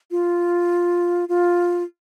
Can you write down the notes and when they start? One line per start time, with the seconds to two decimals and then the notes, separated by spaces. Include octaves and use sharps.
0.11 F4
1.29 F4